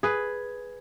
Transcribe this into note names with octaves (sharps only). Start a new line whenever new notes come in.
G#4 B4